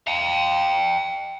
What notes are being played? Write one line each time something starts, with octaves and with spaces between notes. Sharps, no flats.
F5 G5